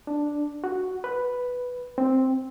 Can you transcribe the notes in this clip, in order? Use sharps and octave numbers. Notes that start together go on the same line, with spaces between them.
D4
F#4
B4
C4